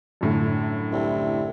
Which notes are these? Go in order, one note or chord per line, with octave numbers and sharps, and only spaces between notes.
F#2 A2 D3
C2